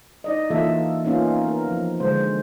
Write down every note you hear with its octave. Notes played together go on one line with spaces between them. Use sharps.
D#4 D5 D#5
E3 A#3 F4 A4 E5
A#3 B3 C#4 D#4 F4
B3 A#4
F3
D3 G#3 C5